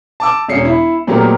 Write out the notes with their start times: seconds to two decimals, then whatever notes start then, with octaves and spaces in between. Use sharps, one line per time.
0.20 A5 D6 E6
0.49 E1 C#4 C7 C#7
0.65 E4
1.07 A#2 F#3 A3 B3 G4 A#4